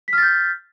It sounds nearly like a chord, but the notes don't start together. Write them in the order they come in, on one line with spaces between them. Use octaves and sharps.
B6 F6 A6 G6